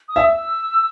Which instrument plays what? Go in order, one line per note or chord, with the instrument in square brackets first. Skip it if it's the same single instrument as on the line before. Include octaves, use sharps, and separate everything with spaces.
[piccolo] D#6
[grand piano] E5
[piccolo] E6